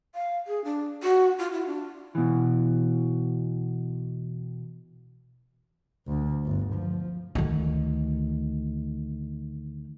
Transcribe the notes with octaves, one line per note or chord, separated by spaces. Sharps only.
F5
G#4
D4
F#4
F4
E4
D4
B2 E3
D2
G1
F3
D2 D#3